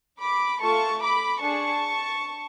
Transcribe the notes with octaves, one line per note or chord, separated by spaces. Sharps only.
B5 D6
A3 F4 A4 A5 C#6
B5 D6
D4 G#4 A5 C#6